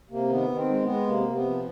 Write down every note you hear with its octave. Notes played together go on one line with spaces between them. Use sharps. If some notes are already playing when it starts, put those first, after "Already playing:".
C3 A#3
D#3 B3
D#3
C4
G#3
B3
G#3
C3 A#3
C3
B3
F3